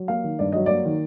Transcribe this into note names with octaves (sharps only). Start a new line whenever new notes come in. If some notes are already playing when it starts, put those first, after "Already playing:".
Already playing: F#3
A#3 F5
D#3
G2 D5
F#3 D#5
A#3 D5
D#3